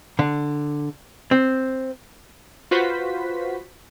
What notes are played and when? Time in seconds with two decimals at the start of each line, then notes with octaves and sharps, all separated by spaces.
0.19 D3
1.31 C4
2.71 F4 F#4 B4 C5 B6